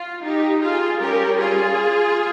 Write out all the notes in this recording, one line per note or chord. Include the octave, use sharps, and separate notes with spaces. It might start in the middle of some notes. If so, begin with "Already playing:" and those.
Already playing: F4
D#4 G4
F4 G#4
G3 C#4 G4 A#4
F4 G#4